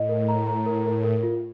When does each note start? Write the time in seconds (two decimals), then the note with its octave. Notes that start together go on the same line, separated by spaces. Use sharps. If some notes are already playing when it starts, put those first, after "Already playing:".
Already playing: A2 D#5
0.09 A#4
0.28 A#5
0.47 A#5
0.66 A#4
0.85 A#4
1.04 A2 A#4
1.23 F4